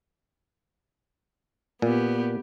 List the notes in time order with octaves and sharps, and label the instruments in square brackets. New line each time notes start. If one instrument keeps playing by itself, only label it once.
[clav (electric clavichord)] A#2 [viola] B3 G4